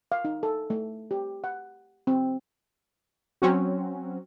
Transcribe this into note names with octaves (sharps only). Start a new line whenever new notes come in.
F5
D#4
A4
A3
G4
F#5
C4
F#3 C4 C#4 F#4